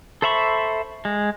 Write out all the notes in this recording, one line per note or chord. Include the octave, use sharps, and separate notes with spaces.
A4 C5 E5 B5 C#6
G#3